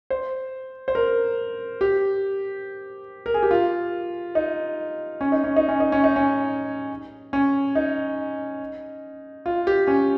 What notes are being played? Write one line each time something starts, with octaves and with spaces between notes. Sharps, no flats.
C5
C5
A#4
G4
A#4
G#4
G4
F4
D#4
C#4
D#4
C#4
D#4
C#4
D#4
C#4
D#4
C#4
C#4
D#4
F4
G4
C#4